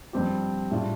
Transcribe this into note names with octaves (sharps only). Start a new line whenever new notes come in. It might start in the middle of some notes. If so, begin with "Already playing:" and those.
G2 F3 C4 G4
A2 G3 D4 F4